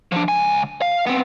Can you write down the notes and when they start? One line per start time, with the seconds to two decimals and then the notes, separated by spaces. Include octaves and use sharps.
0.12 F3 D4
0.28 C#2 G#5
0.82 F5
1.07 B3 C4